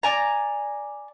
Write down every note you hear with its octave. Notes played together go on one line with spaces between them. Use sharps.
D5 G#5 A#5